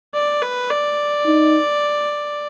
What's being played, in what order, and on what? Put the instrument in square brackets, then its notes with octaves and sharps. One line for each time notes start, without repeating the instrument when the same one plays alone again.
[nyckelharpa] D5
B4
D5
[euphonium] D#4